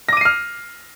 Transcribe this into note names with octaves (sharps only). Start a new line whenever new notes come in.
D6 F6 A#6 C7 D#7